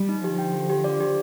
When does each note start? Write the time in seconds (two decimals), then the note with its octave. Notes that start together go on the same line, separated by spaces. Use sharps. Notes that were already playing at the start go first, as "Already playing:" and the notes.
Already playing: G3
0.09 D#4
0.23 D3 F3 G4
0.39 G5
0.54 G4
0.69 G4
0.84 D5
1.00 G4